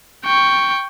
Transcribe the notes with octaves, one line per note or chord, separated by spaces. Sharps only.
G5 C#6